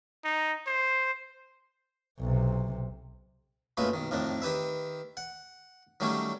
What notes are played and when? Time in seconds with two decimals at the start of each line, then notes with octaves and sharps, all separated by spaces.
0.24 D#4
0.67 C5
2.20 B1 C3
3.77 F#2 A#2 G#3 A3 B4
3.93 B1 D#3
4.11 F2 A2 D#3 D4
4.42 D#3 G4 B4 E5
5.17 F#5
6.00 D#3 F#3 G3 A3 C#4 G4